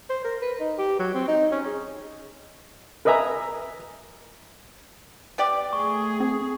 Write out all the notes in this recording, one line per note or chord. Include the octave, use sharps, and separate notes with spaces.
C5
A#4
B4
D#4
G4
F#3
C4
D#4
C#4
G#4
A#4 B4 D#5 E5 G#5 A#5
B3 G4 D5
A3 G#4 C#6
C4